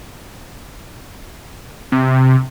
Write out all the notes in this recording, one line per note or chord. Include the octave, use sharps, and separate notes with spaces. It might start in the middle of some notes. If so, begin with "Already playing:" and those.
C3